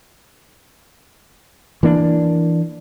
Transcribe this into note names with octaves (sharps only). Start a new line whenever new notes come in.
E3 A#3 D4